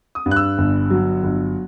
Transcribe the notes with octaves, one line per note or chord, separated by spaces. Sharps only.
D#6
G2
F#6
E6
G1
F#3
G1